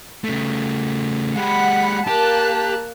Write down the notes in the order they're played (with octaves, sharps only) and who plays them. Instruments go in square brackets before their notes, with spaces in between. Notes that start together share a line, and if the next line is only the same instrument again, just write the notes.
[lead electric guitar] C#3 A3
[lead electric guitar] G#3 G4 [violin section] F#5 B5
[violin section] A#3 A5 F#6 [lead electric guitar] G4